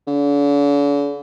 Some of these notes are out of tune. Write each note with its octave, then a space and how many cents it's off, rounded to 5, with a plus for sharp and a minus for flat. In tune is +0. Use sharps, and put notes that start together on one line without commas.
D3 -45